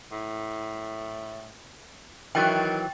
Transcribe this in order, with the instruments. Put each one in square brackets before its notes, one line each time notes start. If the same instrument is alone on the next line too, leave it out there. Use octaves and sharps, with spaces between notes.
[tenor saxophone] A2
[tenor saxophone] D#3 [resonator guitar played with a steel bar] E3 F#3 [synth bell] G5 A6